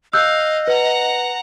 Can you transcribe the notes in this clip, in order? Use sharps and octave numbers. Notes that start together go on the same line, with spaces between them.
D#5 F5 E6 F#6 G6
B4 F#5 A#5